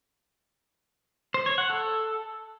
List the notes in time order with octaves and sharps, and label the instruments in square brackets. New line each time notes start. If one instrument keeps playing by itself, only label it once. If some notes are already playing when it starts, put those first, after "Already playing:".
[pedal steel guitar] C5
C#5
F#5
A4